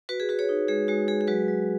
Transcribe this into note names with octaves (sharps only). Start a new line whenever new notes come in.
F#4 B4
G#4
F#4 B4
G#4 C#5
D#4
G#3 G#4
G#3 F#4
G#3 G#4
G#4
F#3 F#4 B4
F#3